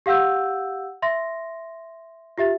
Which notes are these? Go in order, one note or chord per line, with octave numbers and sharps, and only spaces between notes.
G4 F5 F#5 E6 G6
E5 C6 A#6
F4 G4 E5 A6